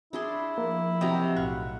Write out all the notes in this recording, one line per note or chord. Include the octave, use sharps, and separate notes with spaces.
D4 E4 G#4 C6
F3 A#3
C3 F#3 G4 D#5 A#5
B1 A2 F5 B5 C#6 F#6